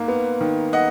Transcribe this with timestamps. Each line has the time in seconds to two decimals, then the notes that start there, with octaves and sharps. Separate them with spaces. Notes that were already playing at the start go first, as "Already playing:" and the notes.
Already playing: G#2 A#3
0.08 B3
0.41 D#3
0.73 D#5 F#5